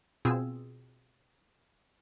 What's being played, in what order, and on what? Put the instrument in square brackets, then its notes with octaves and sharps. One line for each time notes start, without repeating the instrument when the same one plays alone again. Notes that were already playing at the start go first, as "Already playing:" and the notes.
[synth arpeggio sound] B2 C4 F4 G#4 E6